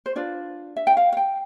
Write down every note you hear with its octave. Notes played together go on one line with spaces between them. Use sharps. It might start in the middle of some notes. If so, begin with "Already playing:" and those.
C5
D4 F4 B4 D5
E5
G5
F5
F5
G5